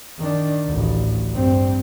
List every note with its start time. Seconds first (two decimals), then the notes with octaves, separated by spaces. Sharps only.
0.18 D#3 D4
0.67 A1 D2
1.31 G2 C4